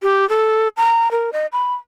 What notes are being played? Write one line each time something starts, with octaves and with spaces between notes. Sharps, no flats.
G4
A4
A#5
A#4
D#5
B5